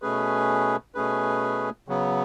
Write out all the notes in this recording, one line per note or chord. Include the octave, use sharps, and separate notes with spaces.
B2 A3 C#4 G#4 B4
B2 A3 C#4 G#4 B4
C#3 F#3 B3